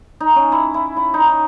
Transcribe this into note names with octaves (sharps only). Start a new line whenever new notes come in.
D#4
C#4
E4
E4
E4
D#4